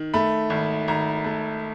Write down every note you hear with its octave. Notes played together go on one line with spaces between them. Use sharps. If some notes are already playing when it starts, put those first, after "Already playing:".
Already playing: D#3
A3 B5
G#1
G#1 A#5
A3